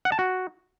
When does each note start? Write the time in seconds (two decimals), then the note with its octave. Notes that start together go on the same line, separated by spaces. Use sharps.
0.05 F#5
0.12 A5
0.19 F#4